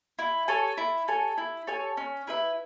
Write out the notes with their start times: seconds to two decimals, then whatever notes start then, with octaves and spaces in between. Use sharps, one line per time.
0.19 E4
0.48 A4 C#5 G#5
0.78 E4
1.08 A4 C#5 G#5
1.38 E4
1.67 A4 C#5 G#5
1.97 C#4
2.27 E4 B4 E5